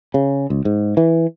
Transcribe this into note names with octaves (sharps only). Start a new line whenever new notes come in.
C#3
C#2
G#2
E3